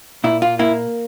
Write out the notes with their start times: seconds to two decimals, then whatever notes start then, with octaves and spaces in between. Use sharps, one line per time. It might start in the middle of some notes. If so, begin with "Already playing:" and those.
0.24 A#2 E4
0.42 F4
0.59 A#3 E4